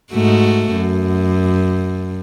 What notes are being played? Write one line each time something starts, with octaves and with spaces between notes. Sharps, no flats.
G#2 A3 F#4
F#2